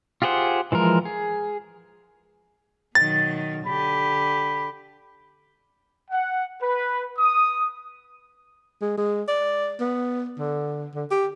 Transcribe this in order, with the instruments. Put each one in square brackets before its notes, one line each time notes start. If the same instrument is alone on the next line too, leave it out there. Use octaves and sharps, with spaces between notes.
[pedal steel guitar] F4 G4 G#4 C5 F#5
E3 F3 G#3 A#4
G#4
[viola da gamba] B2 D#3 F#3 [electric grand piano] A6
[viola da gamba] D3 G4 [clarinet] B5
[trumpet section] F#5
B4
D#6
[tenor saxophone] G#3
G#3
D5
B3
D3
D3
G4